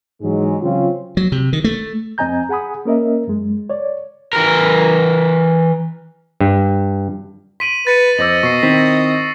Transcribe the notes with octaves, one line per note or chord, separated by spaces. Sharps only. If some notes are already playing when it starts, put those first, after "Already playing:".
G#2 E3 F#3 G#3
C#3 F#3 C4 C#4 F4
F#3
C3
D#3
A3
F2 C4 D#5 G#5 A#5 G6
G#4 F#5 G#5 B5 D#6
A#3 C#4 A#4 D#5 E5
F#2 G#3
C#5 D5
E3 A#4
G2
C6 B6 D7 D#7 F#7
B4 A6 C#7 D#7
F2 C5 D#5 D6 E6 A#6 F#7
B2 C#6 C7
D#3 C4 E4 B6